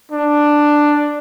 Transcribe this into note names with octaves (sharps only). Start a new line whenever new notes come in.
D4